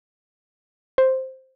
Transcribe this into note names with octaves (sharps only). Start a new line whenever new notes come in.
C5